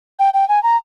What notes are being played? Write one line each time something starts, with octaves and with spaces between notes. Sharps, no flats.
G5
G5
G#5
A#5